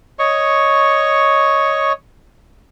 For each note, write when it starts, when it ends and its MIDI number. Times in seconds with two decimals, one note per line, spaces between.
0.19 1.93 73
0.19 1.93 75
0.19 1.93 85